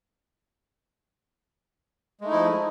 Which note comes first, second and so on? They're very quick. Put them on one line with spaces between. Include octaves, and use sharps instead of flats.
G#3 A3 D#4 E4 F3